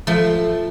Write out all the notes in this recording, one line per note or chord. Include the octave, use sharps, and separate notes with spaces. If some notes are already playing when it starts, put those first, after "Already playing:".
F3 A3